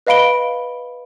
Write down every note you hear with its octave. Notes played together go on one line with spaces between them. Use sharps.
B4 D#5 F5 B5 D7 G7